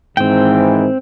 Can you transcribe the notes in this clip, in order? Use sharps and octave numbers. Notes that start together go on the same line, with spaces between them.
G#2 D#3 E3 C4 G5